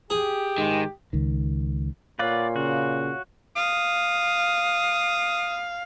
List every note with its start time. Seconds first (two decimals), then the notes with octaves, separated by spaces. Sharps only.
0.10 G4 G#4
0.58 G#2 D#3 G#3
1.13 C#2 D#3
2.19 A#2 B4 C#5 D5 F5 F#5
2.56 C#3 F#4
3.56 F5 D#6